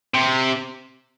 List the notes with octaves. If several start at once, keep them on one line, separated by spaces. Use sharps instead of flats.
C3